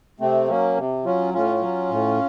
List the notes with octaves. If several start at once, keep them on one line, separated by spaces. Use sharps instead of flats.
C3 A3 C4
F#3 A#3 C#4
C3
F#3 C#4 F4
A2 C#4 F4
F#3
A2